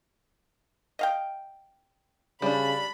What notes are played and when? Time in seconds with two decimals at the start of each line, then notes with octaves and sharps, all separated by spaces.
0.99 D#5 F5 G5
2.42 C#3 G3 D4 B5